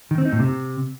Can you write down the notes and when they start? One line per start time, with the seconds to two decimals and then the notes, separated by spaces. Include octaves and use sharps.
0.11 D#3
0.18 C4
0.25 D#4
0.33 A2
0.40 C3